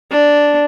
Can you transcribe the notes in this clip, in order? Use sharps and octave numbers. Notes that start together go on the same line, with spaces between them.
D4